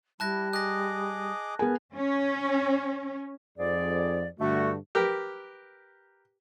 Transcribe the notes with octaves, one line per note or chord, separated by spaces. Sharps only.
G3 E4 A5 F#6 A#6
G#4 D#5 D6 F#6 A#6
B3 G#4 A#4 G#5
C#4
F2 G#2 G#4 D5
G2 D3 A3 F#4
G4 A#4 B4